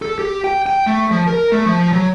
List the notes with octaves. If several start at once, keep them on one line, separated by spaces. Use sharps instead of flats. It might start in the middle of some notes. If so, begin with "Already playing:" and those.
A4
G4
G5
G5
A3
F3
A#4
A3
F3
F#3